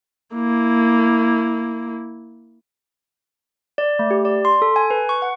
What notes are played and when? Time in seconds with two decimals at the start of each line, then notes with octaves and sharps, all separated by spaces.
0.35 A#3 E4
3.78 D5
3.99 A3
4.11 G4
4.25 D5
4.45 C6
4.62 A4
4.76 G#5
4.91 B4
5.09 C#6
5.22 F#5